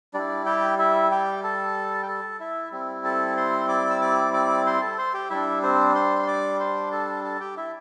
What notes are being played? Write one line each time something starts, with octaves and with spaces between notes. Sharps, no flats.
G3 D4 E4 D5
G4 G5
E4 E5
G4 G5
A4 A5
G5
A4 A5
E4 E5
G3 C4 E4
A4 A5
C5 C6
D5 D6
E6
D5 D6
D5 D6
C5 C6
A4 A5
C5 C6
G4 G5
G3 D4 E4 E5
C4 C5
C5 C6
C6
D5 D6
C5 C6
A4 A5
A4 A5
G4 G5
E4 E5